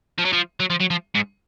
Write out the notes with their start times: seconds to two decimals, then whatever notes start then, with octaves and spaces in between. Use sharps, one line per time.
0.18 F3
0.25 F#3
0.32 F3
0.60 F#3
0.70 F3
0.80 F#3
0.91 F3
1.15 G#2